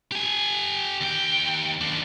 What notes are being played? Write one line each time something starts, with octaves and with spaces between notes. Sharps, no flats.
G4 G#5
D#2 G5
A#3 D4